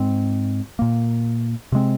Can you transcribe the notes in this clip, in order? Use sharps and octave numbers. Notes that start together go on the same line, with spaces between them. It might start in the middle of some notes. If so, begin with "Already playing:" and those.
Already playing: G#2 G#3 C4
A#2 A#3
C3 G#3 C4